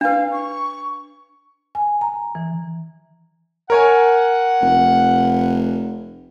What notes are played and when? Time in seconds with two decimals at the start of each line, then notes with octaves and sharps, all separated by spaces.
0.01 D4 B4 F5
0.31 C#6
1.75 G#5
2.01 A#5
2.35 E3
3.70 A#4 C#5 F#5 G#5
4.61 F1